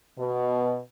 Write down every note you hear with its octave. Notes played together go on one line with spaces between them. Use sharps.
B2